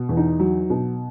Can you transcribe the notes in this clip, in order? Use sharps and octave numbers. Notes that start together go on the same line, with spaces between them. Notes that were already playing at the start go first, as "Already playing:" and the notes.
Already playing: B2
E2
D#4
F#3
B2